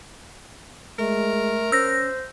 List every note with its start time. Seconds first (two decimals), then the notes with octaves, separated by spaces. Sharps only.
0.99 G#3 A3 A#4
1.72 C#4 C5 E6 A#6